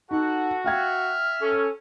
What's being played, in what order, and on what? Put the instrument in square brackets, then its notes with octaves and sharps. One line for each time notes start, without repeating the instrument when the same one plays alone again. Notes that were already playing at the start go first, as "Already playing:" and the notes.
[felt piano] D#4 [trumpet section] F#4 [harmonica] A4 F#5
[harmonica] E5 F6 [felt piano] F5 G5 G#6
[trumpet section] C#4 [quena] A4